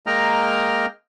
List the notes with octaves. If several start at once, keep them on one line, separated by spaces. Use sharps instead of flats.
G#3 A#3 D#5 G5 A#5 F6